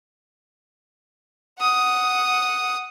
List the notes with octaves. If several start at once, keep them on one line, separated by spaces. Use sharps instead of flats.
F#5 D#6